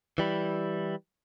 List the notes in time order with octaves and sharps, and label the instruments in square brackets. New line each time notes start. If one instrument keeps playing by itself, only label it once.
[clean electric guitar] E3 G3 E4